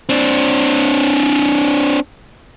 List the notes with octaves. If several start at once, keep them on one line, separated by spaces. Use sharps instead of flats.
C4 D4